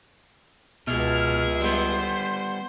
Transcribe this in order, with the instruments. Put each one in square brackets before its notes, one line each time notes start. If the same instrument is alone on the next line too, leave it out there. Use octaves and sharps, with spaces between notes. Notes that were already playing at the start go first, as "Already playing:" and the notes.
[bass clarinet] C#2 [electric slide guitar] B2 [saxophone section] E4 G#4 E5 [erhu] F6
[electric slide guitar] G3 B3 [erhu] C5